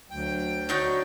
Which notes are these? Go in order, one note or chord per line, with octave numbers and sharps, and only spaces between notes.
D2 F#3 G5
D4 D#4 F#4 C#5 G6